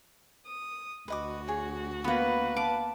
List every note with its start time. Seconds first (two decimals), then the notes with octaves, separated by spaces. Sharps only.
0.46 D#6
1.08 D2 F#4 B4 D#5 D6
1.48 G#4 C#5
2.04 A#3 B3 B4 B5
2.57 F5 A5 D6